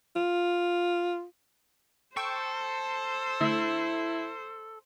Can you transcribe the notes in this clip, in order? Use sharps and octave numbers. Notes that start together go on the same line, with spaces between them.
F4
A4 C5 G5 C#6
D3 A3 E4